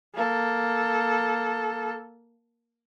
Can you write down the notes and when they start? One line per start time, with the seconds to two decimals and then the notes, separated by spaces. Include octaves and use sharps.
0.15 A#3 A4